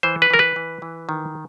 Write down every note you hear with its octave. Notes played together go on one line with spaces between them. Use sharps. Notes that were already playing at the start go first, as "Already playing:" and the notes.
E3 C5
B4
E3 A#4
B4
E3
E3
D#3